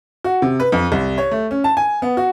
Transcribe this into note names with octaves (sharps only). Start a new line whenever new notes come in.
F#4
C3
B4
F2
C2
C#5
A3
C#4
A5
G#5
B3
F#4